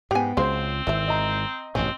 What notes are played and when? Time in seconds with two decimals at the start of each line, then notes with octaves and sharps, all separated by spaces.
0.11 G#2 B3 G4 G5 G#5
0.37 C#2 C#3 F#3 C4 C5 C6
0.87 G#1 E3 E5
1.08 D#5 A#5
1.75 A1 G2 B2 C4 C#4